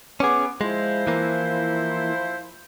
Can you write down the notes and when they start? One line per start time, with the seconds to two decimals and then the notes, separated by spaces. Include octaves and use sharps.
0.20 B3 C#4 G#4 D6
0.61 F3 G#3 E4 C5
1.07 E3 A#3